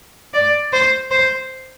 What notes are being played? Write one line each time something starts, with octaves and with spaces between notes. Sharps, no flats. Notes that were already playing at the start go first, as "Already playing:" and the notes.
D5
C5
C5